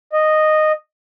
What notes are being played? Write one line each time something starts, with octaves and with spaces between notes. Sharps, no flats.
D#5